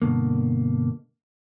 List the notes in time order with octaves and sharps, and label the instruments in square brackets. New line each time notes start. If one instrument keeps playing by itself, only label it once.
[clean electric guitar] G2 B2 D3 A#3